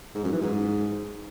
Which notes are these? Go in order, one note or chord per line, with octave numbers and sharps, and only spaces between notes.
G#2
F#2
E3
G#2